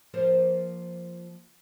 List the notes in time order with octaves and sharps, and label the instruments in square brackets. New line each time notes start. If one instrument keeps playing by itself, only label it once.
[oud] F3 A#3 C5